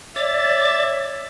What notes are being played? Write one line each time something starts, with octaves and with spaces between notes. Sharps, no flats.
C#5 D5 E5 A6